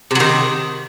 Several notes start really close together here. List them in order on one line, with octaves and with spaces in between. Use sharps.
C3 F#3 D#3